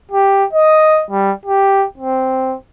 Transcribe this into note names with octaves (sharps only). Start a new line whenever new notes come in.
G4
D#5
G3
G4
C4